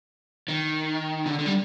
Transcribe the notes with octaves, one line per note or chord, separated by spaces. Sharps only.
D#3
D3
D3
G3